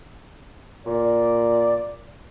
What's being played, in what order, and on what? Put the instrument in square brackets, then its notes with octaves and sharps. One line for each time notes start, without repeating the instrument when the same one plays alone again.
[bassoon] A#2 [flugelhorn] D5